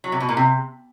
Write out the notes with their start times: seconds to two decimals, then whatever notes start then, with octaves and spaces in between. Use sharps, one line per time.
0.04 F#3
0.12 C3
0.20 B2
0.29 A#2
0.37 C3